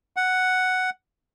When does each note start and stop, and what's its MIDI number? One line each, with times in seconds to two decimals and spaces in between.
0.16 0.90 78